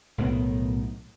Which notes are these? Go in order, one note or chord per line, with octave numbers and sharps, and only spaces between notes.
B1 A2 D#3 B3